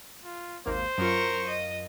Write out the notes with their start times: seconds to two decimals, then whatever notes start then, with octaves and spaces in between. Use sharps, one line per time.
0.24 F4
0.66 G#1 D#2 A#3 C5
0.98 F#2 F4 A#4 C#6
1.47 D#5